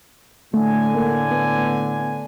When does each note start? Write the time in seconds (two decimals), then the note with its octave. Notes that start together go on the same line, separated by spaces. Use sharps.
0.54 A2 D3 A3 G#5
0.95 A#3
1.31 B3